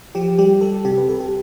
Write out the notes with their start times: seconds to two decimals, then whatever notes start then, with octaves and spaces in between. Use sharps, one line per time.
0.15 F3 G4
0.38 G3 G4
0.61 G3 A4
0.85 C3 G4
0.98 B4
1.08 C2 A4
1.20 G4